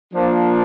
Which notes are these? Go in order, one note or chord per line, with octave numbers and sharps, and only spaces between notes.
F3 A#3 D4